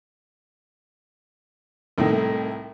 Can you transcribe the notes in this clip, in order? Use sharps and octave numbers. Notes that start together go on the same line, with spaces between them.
C2 A2 C3 D#3